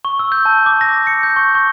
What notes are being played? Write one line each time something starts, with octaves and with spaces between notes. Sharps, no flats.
C#6
E6
G6
A5
D6
A#6
C#7
G6
C#6
C#6